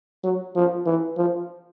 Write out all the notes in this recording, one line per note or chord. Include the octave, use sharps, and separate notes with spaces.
F#3
F3
E3
F3